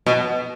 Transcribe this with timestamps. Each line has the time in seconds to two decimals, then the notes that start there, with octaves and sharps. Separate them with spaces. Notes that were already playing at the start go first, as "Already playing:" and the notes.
0.06 B2